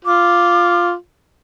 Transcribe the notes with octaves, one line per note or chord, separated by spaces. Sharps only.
F4 D6